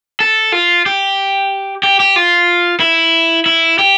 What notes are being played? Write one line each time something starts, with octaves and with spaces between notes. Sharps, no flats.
A4
F4
G4
G4
G4
F4
E4
E4
G4